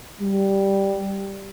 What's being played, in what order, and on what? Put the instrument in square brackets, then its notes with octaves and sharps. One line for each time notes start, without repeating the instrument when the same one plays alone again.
[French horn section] G3